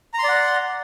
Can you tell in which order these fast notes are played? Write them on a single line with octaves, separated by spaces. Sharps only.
A#5 C6 D5 F#5